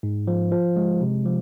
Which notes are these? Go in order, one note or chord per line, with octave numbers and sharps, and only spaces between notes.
G#2
F3
F3
G#3
C3
F3